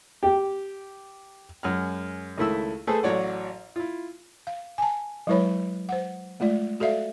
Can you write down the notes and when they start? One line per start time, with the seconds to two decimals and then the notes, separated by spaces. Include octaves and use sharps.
0.23 G4
1.63 F#2 G#3 F#5 F6
2.37 C#2 D#3 A3 E4 E6
2.87 A3 G#4 A4 B4 C5
3.03 A1 F#3 C#5 D5 F#5
3.76 E4 F4
4.47 F5
4.78 G#5 A5
5.27 F#3 G#3 E4 B4 C#5 B5
5.89 C5 F#5
6.40 G#3 A3 F4 D5
6.80 F#4 A4 D5 E5 F5